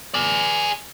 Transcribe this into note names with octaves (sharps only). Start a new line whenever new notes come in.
G#4 D5